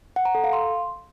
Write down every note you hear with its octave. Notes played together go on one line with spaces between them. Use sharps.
F#5
A#5
A4
F5
C6